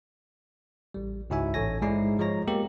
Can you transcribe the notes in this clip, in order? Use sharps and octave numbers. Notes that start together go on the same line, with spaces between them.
A1 G3
C#2 G#2 E4 F#4 E5 G#5
A1 A4 C#5 G#5 A#6
G#2 G#3 D#4 E4 D5 C7
F3 G#3 F4 C#5 A#5 A#6
G#3 A#3 B3 G4